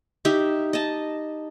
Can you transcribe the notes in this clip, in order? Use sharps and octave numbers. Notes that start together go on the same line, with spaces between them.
D#4 G4 E5
D#5 A5